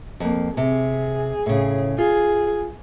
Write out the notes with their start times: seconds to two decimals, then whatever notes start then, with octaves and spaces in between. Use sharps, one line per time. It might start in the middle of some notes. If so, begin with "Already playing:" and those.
0.20 F2 A#3
0.57 C3 G#4
1.46 A2 C#3
1.98 F4 G#4